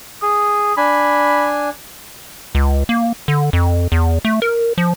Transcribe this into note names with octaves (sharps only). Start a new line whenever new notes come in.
G#4 D#6
D4 G#5 B5
C#2
A#3
D3
F2
E2
A3
A#4
F3